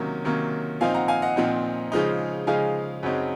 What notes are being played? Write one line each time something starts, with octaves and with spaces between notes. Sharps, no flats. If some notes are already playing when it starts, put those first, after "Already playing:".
Already playing: C3 D#3 F#3 A#3 C#4
C3 D#3 F#3 A#3 C#4
A#2 F3 C4 D#4 F5 G#5
F#5 A#5
F5 G#5
D#5 F#5
A#2 F3 C4 D#4
C#3 F3 G#3 D#4
C#3 F3 G#3 D#4 F5 G#5
F#2 C#3 F#3 C4 D#4